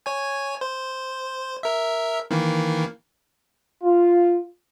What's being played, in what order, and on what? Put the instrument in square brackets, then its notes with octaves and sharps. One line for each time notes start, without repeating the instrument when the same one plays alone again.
[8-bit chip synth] C#5 G#5
C5
A#4 E5
D#3 E3 A#3
[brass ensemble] F4